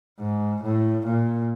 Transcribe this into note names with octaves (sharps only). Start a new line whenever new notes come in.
G#2
A2
A#2